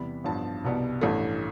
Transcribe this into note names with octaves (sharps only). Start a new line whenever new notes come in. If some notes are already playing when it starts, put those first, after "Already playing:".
Already playing: E2 C3 G3 B3 B5
A1 G2 F3 B3 A5
C2 B2 G3 B3
A1 G2 E3 A3